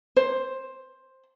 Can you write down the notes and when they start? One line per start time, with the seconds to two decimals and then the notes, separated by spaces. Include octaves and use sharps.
0.16 C5